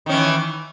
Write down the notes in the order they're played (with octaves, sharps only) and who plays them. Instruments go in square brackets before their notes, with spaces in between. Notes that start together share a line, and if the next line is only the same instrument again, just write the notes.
[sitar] D#3
C#4
E3